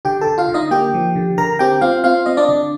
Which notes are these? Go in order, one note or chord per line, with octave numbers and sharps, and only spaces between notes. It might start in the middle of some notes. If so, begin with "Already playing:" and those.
D3 G4 G5
A4 A5
D3
F4 F5
D3
D#4 D#5
A#3 G4 G5
F3
D3
D3 A#4 A#5
C4 G4 G5
C4 F4 F5
C4 F4 F5
C4 D#5
D4 D5
D3